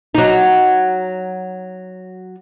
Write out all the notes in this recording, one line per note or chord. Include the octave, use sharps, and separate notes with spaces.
F#3 D#4